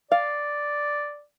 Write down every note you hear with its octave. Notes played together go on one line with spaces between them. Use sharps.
D5 F5